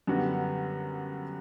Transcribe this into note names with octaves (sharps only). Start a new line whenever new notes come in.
F#2 D3 G3 B3 F#4